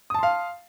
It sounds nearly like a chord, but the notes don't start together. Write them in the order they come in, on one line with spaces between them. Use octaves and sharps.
D#6 A5 C6 F5